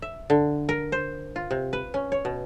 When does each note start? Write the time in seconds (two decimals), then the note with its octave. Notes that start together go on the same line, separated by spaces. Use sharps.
0.02 E5
0.30 D3
0.69 A#4
0.92 C5
1.36 F4
1.51 C3
1.73 B4
1.94 C#4
2.12 C#5
2.25 B2